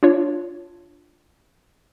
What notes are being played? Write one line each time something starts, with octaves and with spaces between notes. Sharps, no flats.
D4 F4 C#5